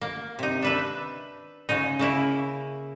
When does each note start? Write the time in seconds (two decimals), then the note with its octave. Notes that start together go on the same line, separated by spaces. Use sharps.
0.01 A#3
0.39 C3 D#4
0.62 D4 B4 E5
1.69 C#3 G#3 D#4
1.99 C#3 A#3 E4